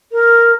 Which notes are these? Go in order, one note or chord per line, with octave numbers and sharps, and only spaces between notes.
A#4